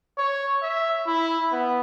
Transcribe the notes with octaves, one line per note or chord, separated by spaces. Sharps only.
C#5
E5
E4
B3